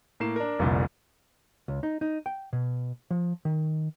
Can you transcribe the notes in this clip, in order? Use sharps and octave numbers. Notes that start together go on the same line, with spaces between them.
A2 A#3 C7 E7
D4 A#4
F1 C2 A#2 D3
C#2
D#4
D#4
G5
B2
F3
D#3